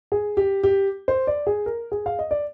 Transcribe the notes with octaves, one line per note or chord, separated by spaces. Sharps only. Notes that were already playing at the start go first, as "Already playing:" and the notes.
G#4
G4
G4
C5
D5
G#4
A#4
G#4
F5
D#5
D5